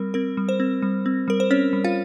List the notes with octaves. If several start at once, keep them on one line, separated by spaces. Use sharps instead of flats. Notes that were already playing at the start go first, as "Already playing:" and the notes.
Already playing: G3 C4 A#4
C4 A#4
G3
C5
C4
G3
C4
G3 A#4
C5
C4 C#4 C#5
G3
F4 F5